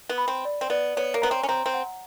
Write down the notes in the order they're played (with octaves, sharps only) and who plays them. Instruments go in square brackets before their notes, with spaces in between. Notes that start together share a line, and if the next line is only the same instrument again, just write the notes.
[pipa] B3
[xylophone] B5
[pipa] C4
[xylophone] D5
[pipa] C4
[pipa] B3 [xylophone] D5
[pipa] B3 [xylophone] C#5
[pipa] A#3
[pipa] B3 [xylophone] A#5
[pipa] C4
C#4
[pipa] C4 [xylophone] A#5
[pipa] C4
[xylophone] F#5